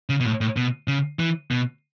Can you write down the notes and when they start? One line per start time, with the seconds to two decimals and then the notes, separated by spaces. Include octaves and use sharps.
0.09 C#3
0.20 B2
0.25 A2
0.41 A2
0.57 B2
0.88 C#3
1.19 E3
1.51 B2